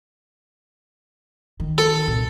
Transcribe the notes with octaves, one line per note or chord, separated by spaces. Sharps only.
D#3
A4
C2 A#2